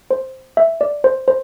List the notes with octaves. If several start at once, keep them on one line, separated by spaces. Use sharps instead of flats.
C5
E5
D5
C5
C5